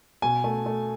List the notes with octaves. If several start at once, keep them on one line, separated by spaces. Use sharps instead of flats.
B2 G#5
A3
A3